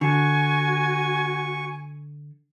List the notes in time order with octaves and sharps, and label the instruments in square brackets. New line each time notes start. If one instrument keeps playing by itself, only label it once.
[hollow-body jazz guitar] D3 [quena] F#4 [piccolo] G#5 [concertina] C#6